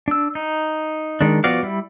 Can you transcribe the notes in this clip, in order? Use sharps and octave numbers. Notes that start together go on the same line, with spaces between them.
D4 E6
D#4
D#3 G#3 D4
F3 B3 F#4 D5 F5
G3 E4